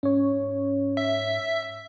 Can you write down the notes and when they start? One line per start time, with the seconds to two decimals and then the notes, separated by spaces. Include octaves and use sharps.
0.03 G#2 C#4 C#5
0.97 E5